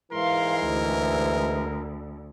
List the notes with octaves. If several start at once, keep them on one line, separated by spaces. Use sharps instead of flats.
G#2 E3 A#4 F5 C6
D2